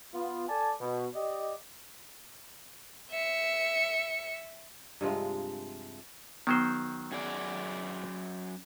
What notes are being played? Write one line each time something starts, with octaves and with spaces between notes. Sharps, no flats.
B3 F4
A4 D5 G#5 A5
B2
G4 D5 D#5
E5 C#7
G2 C3 F3 G#3
D#3 F#3 B3 C5
F#2 G#4 D5